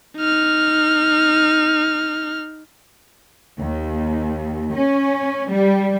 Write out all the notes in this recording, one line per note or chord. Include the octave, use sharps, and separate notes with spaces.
D#4 F6
D#2
C#4
G3